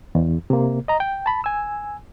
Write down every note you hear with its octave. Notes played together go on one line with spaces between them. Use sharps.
E2
C3 A#3
D#5 A#5
G5
A5 B5
G#5 E6